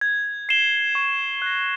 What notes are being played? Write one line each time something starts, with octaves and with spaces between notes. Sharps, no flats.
G#6
C7 E7 G7
C#6
F#6 A#6